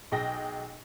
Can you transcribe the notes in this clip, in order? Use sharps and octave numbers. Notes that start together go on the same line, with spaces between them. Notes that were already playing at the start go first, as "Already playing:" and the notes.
B1 G#4 G5 A#6